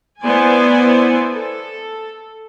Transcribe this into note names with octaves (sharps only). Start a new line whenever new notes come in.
B3 E4 C5 D5 G#5
A4